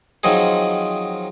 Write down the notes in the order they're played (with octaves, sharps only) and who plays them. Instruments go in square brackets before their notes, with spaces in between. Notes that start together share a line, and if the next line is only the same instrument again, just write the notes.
[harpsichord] D#3 F3 F#3 C4 D#4 G#4